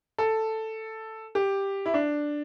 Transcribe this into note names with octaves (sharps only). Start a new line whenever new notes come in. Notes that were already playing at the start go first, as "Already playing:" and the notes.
A4
G4
E4
D4